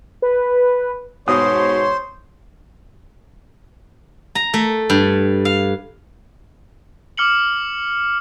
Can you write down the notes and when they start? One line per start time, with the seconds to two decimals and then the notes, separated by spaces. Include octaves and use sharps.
0.22 B4
1.28 G#2 B2 C5 C#5 C6 D#6
4.35 A#5
4.54 A3
4.90 G2
5.45 F5
7.18 D6 F6 C#7 F#7